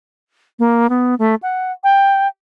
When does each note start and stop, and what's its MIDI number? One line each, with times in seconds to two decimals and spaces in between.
0.59 0.87 58
0.89 1.15 59
1.19 1.35 57
1.43 1.71 78
1.84 2.28 79